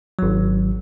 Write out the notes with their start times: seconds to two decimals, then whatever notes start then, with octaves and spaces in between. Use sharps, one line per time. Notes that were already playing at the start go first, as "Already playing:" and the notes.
0.19 G#1 F#3